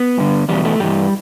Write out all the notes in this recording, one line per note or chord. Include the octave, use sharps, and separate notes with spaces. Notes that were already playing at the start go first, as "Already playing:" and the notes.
Already playing: B3
G2 D3
E2 B2 G3
A3
G2 E3 G3